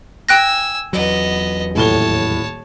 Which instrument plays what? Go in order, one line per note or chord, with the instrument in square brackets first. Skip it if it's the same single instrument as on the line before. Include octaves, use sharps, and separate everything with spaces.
[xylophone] G5 F#6 A#6 [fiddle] G#5 E6
[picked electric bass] E2 F#3 [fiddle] B3 D#5
[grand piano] D#1 A2 G7 [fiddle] C#5 A5